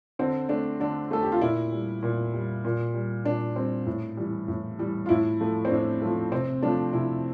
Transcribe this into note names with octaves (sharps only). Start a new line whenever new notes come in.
D3 C4
A3 D4
D3 D4
A3 A4
G4
F4
A#2 E4
G3
A#2
G3
A#2
G3
A#2 D4
G3 C4
A2
E3 G3
A2
E3 G3
F4
A2 E4
F3 A3
C4
A2 D4
F3 A3
C3 C4
F3 A3 D4
C3 E4